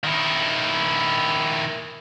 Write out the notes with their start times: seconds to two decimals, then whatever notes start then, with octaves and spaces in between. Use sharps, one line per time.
0.04 D#3 E4